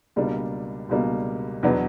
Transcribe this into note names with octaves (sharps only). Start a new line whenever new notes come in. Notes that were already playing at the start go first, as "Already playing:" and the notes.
C#2 B2 G3 A#3 D4
C#2 B2 G3 A#3 D4
E2 B2 F#3 B3 D4